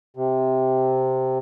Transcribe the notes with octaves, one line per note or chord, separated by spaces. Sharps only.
C3